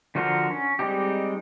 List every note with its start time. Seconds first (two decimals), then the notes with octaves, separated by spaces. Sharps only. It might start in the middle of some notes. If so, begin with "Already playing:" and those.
0.15 D3 F3 F#4 A#4 C5
0.51 C#4
0.79 G3 G#3 C4 D#4 G4